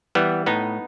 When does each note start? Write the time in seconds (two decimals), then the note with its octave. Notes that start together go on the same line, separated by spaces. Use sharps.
0.15 E3 G3 B3
0.46 A2 B3 D#4